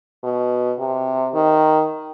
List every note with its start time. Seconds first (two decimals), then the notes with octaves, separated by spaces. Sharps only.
0.24 B2
0.79 C3
1.34 D#3